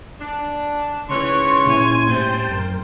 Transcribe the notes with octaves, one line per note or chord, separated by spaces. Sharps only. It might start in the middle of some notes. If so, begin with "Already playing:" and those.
D4
G#2 C#3 E3 C#5 C6 C#6
A#2 C#4 E4 G#5
A2 G3 C4 C5 G5 A5
F#2 A#4